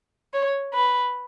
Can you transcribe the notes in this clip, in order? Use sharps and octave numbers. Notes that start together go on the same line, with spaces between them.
C#5
B4